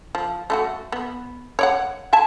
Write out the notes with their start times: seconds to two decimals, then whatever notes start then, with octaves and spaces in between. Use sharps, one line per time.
0.15 F3
0.50 A3 F4 F#4
0.92 B3
1.59 C#5 D5 F#5
2.13 E5 G#5 A5